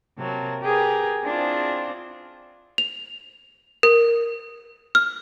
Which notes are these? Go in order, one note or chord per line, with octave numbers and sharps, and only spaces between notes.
C3 F#3 A#3 A5
G4 G#4 A#4 B4
C4 D4 E4 F4 G#4 C5
F7
A#4
F6